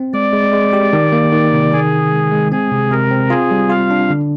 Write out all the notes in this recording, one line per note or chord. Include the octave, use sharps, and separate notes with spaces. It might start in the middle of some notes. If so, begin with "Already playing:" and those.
Already playing: C4
G#3 D5
G#3
G#3
G4
D#3
A#3
D#3
C3
D#3 G#4
D#3
G#3
G#3
C4 G#4
C3
C3 A#4
C4
F4 G#4
G3
F4 F5
D4
D3